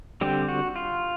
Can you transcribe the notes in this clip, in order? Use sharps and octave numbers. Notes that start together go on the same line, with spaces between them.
D3 G3 C4 G4
F#4
F4